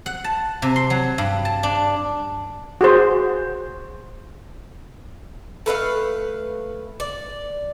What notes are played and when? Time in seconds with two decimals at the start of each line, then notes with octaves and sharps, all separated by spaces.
0.06 F#5
0.24 A5
0.62 C3
0.76 C6
0.90 F#3
1.18 G2
1.45 A5
1.63 D4
2.81 F#4 G#4 C5
5.66 A3 B4 E5 F5
7.00 D5